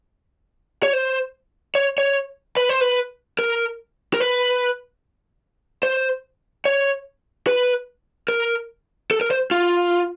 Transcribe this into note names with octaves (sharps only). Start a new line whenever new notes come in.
C#5
C5
C#5
C#5
B4
C5
B4
A#4
A#4
B4
C5
C#5
B4
A#4
A4
A#4
C5
F4